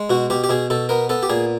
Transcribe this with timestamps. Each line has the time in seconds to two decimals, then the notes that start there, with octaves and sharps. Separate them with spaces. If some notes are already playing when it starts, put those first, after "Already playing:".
Already playing: G#3
0.10 B2 F#4
0.30 B2 G4
0.44 G4
0.49 B2 G#4
0.70 B2 A4
0.89 B3 A#4
1.09 B3 A4
1.23 G4
1.29 A#2 G#4